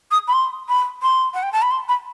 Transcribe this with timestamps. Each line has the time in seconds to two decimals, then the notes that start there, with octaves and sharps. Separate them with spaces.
0.11 D#6
0.28 B5
0.33 C6
0.69 B5
1.02 C6
1.34 F#5
1.43 G5
1.52 A5
1.62 B5
1.71 C6
1.88 B5